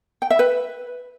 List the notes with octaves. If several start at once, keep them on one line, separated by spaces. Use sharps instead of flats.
G5
E5
B4